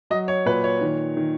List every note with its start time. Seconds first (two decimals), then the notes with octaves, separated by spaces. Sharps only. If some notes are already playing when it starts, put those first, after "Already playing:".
0.10 F#3 D#5
0.28 C#5
0.46 A#2 B4
0.64 C#5
0.81 D#3
1.17 D#3